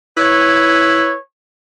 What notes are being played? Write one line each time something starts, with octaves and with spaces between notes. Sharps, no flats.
E4 B4 C#5